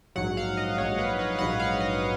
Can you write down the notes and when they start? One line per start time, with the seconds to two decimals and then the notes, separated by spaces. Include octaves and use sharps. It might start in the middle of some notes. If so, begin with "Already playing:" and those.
0.16 A#1 G#2 F#3 F#5
0.37 F5
0.57 D#5
0.78 A#1 G#2 F#3 C#5
0.98 B4
1.19 B4
1.38 A#1 G#2 F#3 F#5
1.60 F5
1.80 D#5